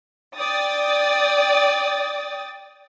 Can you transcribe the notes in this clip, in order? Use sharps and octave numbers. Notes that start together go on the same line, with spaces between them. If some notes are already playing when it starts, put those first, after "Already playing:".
D5 G5 D#6 A6